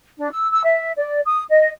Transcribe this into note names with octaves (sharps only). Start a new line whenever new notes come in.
D4
E6
E6
E5
D5
D#6
D#5